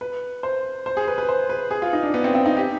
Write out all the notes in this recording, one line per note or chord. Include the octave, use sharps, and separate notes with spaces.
B4
C5
C5
G#4
B4
B4
C5
B4
G#4
F4
D#4
D4
B3
C4
C4
D#4
G4